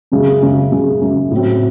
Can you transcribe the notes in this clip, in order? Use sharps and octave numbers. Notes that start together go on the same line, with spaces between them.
F#2 C#3 G#3
F#2 C#3 G#3
F#2 C#3 G#3
F#2 C#3 G#3
A2 F#3 C4